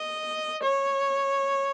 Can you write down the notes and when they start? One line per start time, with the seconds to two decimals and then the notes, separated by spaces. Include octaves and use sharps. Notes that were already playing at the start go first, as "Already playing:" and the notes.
Already playing: D#5
0.63 C#5